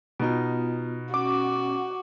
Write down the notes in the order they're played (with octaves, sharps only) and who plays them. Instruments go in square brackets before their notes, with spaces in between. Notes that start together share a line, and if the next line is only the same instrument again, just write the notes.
[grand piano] B2 D#4 [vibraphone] B3 F4
[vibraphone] C#4 [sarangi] F#4 [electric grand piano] D6